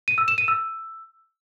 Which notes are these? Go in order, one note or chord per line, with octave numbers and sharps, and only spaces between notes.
D#7
E6
E7
D#7
E6